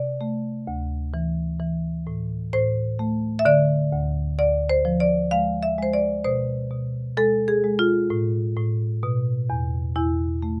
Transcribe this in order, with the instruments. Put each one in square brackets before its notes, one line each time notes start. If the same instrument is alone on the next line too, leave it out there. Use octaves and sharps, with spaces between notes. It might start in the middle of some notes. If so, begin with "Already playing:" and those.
Already playing: [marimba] C3 D5
A3
D2
E3
E3
A2
A2 C5
A3
E5
D3 D5
D2
D2 D5
C5
F3
D5
G#3 F5
E5
G#3 C5
D5
B2 C5
B2
G#3 A4
G#4
G#3
F4
A2
A2
B2
E2
E2 E4
A3